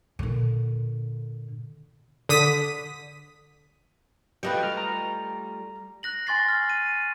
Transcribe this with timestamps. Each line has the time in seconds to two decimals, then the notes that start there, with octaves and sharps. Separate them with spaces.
0.19 A#2 D3
2.29 D3 D#6 B6 D#7
4.43 G3 A3 F4 B4 D#5 G5
4.63 F6
4.77 A#5
6.03 F#6 A#6 F#7
6.27 G#5 C6 C#6 A6 A#6 C7
6.48 F6
6.70 D#7